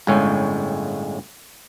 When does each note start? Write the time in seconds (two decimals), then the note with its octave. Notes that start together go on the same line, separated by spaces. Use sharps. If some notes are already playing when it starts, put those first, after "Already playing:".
0.07 G1 A2 G#3 C#4